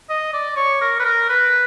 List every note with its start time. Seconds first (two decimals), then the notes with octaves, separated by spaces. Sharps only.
0.10 D#5
0.33 D5
0.56 C#5
0.81 A#4
1.00 B4
1.05 A#4
1.29 B4